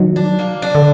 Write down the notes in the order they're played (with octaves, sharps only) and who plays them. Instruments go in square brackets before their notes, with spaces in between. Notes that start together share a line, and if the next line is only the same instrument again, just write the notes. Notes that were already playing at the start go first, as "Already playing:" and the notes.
Already playing: [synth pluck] D#3 F#3
[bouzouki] D4
A#3
D4
[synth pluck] D3